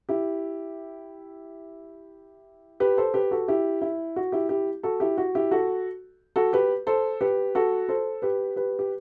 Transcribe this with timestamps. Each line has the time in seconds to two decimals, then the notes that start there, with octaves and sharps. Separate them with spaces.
0.09 E4 G4
2.80 G4 B4
2.98 A4 C5
3.14 G4 B4
3.31 F#4 A4
3.48 E4 G4
3.82 E4
4.16 F#4
4.32 E4 G4
4.49 E4 G4
4.83 F#4 A4
5.00 E4 G4
5.18 F#4
5.35 E4 G4
5.51 F#4 A4
6.36 F#4 A4
6.53 G4 B4
6.87 A4 C5
7.21 G4 B4
7.55 F#4 A4
7.89 A4 C5
8.22 G4 B4
8.56 G4 B4
8.79 G4